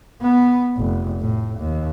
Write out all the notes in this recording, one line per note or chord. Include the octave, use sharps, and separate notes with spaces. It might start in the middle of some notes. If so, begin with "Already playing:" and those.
B3
F1
A2
D#2